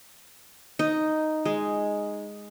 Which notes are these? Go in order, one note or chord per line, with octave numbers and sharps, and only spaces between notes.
D#4
G#3